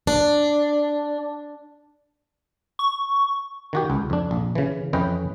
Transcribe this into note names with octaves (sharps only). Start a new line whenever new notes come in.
D4
C#6
D#3 F#4 G4
C#2
F2 D4
A#1
C#3 E3
F2 E3 C#4 B4 D#5 G5